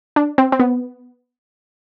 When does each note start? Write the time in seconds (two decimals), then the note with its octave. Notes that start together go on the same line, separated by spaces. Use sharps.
0.16 D4
0.38 C4
0.52 C4
0.60 B3